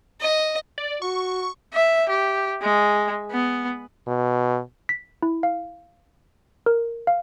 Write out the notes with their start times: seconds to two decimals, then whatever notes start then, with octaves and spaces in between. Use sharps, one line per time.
0.21 D#5
0.78 D5
1.02 F#4 C#6
1.74 E5
2.09 G4
2.62 G#3
3.31 B3
4.07 B2
4.89 B6
5.22 E4
5.43 F5
6.66 A#4
7.07 F5